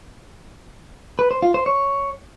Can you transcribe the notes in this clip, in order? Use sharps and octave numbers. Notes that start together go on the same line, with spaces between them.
B4
C5
F4
C5
C#5